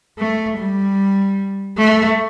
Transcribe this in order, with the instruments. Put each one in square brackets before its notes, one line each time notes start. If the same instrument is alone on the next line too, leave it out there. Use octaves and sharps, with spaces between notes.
[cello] A3
G3
A3